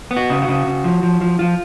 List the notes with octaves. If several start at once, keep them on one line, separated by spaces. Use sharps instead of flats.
B3
F#4
C#3
F#4
C#3
C#3
F3
F3
F3
F3 F4